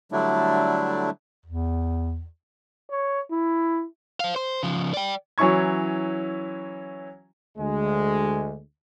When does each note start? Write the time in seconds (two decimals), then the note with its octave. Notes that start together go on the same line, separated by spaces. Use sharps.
0.12 D3 F#3 G3 A3 D4 E4
1.46 E2
2.90 C#5
3.31 E4
4.20 C5 F5
4.36 C5
4.63 C#3 F3
4.94 D5 G5
5.38 E3 F#3 C#4 E4 C#6 G#6
7.58 D2 G#3